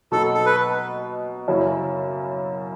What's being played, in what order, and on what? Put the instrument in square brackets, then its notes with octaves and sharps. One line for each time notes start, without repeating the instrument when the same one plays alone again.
[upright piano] B2 F#3 B3 D#4 [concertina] A4
[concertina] A4
B4
[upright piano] F#2 C#3 F#3 C#4 E4